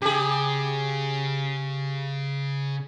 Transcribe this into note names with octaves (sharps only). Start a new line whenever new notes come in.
C#3 G4 G#4